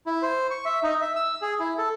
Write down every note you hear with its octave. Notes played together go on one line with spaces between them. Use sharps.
E4
C5
C#6
E5
D#4
E5
E6
G#4
E4
A4